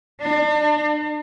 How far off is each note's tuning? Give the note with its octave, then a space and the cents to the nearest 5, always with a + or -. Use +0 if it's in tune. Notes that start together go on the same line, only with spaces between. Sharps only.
D4 +40